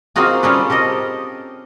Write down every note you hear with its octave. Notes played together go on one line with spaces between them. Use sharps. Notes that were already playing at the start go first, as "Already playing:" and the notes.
A#3 C4 D#4 F4 F#4 G#4
G3 C4 C#4 G#4 A4 B4
G4 A4 A#4 D#5